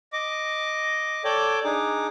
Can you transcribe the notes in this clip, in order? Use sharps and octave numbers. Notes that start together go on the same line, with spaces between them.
D#5 D6
A4 C#5 D5 G5 D6
D4 D#4 G#4 D6